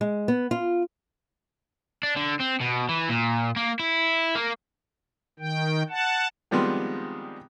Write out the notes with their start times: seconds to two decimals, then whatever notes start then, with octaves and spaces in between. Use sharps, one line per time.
0.01 G#3
0.28 B3
0.51 F4
2.03 D4
2.17 D3
2.40 C4
2.61 B2
2.89 E3
3.09 A#2
3.56 A#3
3.79 E4
4.35 A#3
5.39 D#3 G5
5.90 F#5 A5
6.51 D#3 F3 G3 G#3 B3 C4